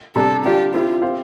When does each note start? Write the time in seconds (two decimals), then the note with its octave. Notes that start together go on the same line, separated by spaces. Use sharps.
0.16 C3 G3 D4 A4
0.44 D3 G3 D4 F4 G4
0.74 C4 E4 F4 G4
1.02 C4 G4 C5 F5